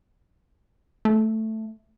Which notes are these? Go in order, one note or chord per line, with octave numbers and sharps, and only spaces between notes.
A3